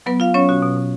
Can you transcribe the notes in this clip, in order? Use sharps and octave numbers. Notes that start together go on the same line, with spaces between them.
F#3 B3 B4
B3 F4 F5
F#3 C#4 C#5
B2 F#4
B2
B2